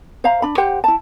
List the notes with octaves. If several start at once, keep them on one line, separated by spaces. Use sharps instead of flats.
C5 E5 F5 A#5
D4 B5
G4 C5 F#5 G5
E4 A5